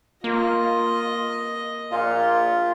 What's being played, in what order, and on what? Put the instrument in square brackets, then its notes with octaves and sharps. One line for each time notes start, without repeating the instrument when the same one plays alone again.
[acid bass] A#3 [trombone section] F4 [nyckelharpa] D#5
[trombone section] A#1 A#2 [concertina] F4